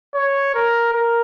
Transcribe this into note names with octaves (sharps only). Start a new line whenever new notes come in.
C#5
A#4
A#4